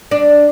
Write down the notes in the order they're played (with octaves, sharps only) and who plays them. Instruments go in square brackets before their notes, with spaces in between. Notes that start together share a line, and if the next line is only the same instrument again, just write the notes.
[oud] D4